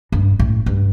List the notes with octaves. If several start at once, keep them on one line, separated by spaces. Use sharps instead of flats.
G2
A2
G2